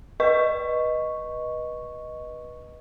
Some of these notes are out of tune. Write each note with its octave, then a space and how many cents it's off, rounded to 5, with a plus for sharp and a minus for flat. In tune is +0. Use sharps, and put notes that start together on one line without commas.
B4 -20 D#5 +0 C#6 +0